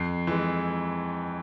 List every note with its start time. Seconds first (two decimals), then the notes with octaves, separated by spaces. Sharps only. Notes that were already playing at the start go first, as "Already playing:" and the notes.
Already playing: F2 C7
0.27 E3 G#3